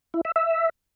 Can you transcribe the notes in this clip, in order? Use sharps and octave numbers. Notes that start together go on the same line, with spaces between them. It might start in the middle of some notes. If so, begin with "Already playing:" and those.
E4
E5
E5